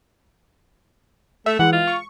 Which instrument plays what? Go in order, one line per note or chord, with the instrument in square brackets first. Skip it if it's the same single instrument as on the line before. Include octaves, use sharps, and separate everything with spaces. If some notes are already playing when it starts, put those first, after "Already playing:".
[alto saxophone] A3 [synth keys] E5
[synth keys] E3 G#3 [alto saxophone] F#5
[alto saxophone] F4
[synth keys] C#6